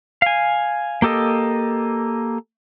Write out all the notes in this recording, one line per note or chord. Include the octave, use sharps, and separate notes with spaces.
F5 G#5
A#3 G4 A4 D#5